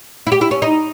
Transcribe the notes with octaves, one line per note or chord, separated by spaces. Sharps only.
E4
G4
E4
C#4
D#4